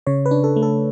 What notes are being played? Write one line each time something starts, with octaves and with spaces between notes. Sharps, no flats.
C#3 C#5
B4
D4
A4
A3
A4